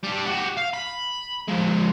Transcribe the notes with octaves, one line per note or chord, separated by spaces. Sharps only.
G3 D4
F#4 G4
F5
B5
F3 G#3